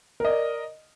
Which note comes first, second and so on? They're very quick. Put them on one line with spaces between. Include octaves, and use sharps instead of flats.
A#4 D#5 D5